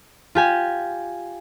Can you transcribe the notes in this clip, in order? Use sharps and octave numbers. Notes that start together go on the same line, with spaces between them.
F4 G4 G#5